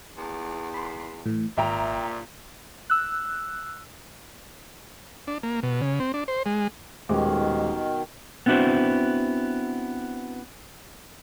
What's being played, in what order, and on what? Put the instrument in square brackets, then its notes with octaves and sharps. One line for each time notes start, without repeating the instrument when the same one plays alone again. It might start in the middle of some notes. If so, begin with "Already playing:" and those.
[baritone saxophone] E2
[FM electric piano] B5 C6
A2 E3
[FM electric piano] G#1 [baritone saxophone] A#2 [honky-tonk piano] E5 G5 A#5
[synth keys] E6 F#6
[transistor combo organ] D4
A#3
B2
C#3
C4
D4
C5
G#3
[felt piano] D#1 G#3 D6 [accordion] B2 D#3
[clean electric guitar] B3 C4 D4 E4 F#4 C5